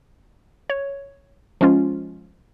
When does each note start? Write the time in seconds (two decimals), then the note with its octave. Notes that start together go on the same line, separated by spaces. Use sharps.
0.70 C#5
1.61 F3 G#3 C#4 F4